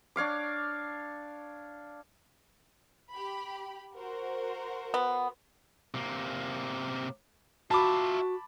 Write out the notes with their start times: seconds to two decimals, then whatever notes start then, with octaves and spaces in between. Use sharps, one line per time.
0.16 D4 C#5 F5 D6
3.11 G4 B5
3.93 F#4 A#4 C5
4.94 B3
5.94 C3 A#3
7.71 F4 F#4 E5 A5 B5 D6